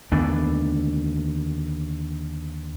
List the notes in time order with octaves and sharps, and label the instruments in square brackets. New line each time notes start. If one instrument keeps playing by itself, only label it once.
[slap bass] D#2 D3 B3 D4